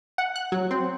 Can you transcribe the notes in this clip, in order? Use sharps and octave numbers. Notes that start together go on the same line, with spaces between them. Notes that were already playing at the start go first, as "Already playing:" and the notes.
F#5
F#6
F#3
C4